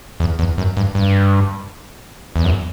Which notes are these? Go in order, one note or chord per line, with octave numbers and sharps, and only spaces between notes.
E2
E2
F#2
G2
G2
E2
F#2